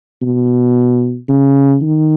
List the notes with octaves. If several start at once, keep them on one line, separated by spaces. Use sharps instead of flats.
B2
C#3
D#3